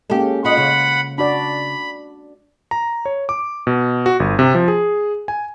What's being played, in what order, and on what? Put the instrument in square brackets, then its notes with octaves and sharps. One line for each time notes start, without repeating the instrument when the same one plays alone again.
[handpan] G#3 A#3 C#4 [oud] G4 A4
[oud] F4 D#5 [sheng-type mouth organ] F#5 B5
[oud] C#3
[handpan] D4 F#4 D5 [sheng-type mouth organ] B5
[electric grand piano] A#5
C#5
D6
B2
F#4
G1
C3
F3
G#4
G#5